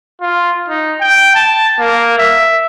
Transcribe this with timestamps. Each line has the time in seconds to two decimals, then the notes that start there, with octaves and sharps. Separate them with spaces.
0.21 F4
0.68 D#4
1.01 G5
1.35 A5
1.79 A#3
2.18 E5